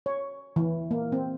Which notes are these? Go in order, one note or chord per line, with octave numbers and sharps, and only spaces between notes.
C#5
E3
A#3
C4